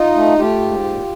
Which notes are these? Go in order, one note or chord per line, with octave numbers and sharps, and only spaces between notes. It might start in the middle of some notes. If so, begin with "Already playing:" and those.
Already playing: D#4 F4
A3
A3 F4 G4
G#2
A#2